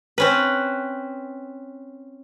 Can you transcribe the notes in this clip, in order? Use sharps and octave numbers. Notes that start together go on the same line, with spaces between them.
C4 C#4 B4